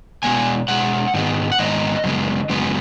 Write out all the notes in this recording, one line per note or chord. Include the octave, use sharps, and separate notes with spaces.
B2 G#3 B3 G#5
B2 G#3 F#5
G#2 D#3 G#3 B3
F#5
G#2 D#3 G#3 B3 D#5
F#2 C#3 G#3 B3
F#2 C#3 G#3 B3